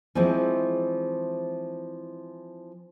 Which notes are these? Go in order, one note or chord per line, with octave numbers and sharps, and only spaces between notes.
E3 F3 G#3 C4 E4